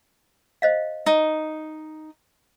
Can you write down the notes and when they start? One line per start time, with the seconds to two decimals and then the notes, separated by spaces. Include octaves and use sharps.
0.62 C5 D#5 F5
1.06 D#4